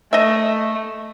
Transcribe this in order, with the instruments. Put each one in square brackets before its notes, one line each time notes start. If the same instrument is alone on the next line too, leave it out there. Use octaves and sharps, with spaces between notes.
[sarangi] A3 [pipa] D#5 E5